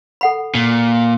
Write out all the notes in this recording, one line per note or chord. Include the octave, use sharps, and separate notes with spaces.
A4 F#5 B5
A#2